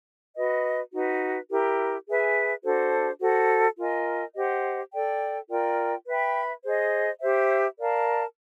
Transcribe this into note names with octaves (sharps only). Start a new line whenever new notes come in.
F#4 B4 D#5
D#4 F#4 B4
E4 G4 A#4
G#4 B4 E5 G#5
D4 F#4 A4 C5
F#4 A4 C5
F4 A#4 D#5 G#5
G4 C5 D#5 F#5
A4 D5 G5
F4 A#4 D5 G5
B4 E5 G5 B5
G#4 C5 D#5
G4 C5 E5
A#4 D5 F5 A5